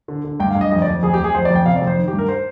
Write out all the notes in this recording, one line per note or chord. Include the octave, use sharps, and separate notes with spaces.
D3
D3
G2 G5
F5
G2
D#5
F2 D#5
D5
F2
F2 G#4
G4
F2
G#4
F2 C5
D5
F2
G5
C3 F5
D5
F2
C5
D#3
G4
G2
A#4
C5